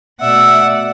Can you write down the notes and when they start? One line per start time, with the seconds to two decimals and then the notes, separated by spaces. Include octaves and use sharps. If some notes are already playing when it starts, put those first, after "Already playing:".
0.21 B2 A3 D5 E5 F#5 E6